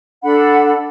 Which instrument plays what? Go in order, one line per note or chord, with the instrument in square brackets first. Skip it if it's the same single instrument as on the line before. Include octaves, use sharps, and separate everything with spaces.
[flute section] D4 A4 F#5 B5